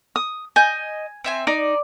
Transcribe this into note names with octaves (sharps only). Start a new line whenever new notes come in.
D#6
D#5 G#5 G6
C4 E5 G#5
D#4 D5